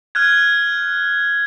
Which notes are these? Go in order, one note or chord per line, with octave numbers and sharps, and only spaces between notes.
F6 F#6 G#6